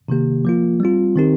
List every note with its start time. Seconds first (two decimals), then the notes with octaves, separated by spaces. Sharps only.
0.08 C3 D#3 A#3 G4
0.45 F3 A#3 F4
0.80 G3 C4 F4
1.16 D#3 C4 D#4 G4 A#4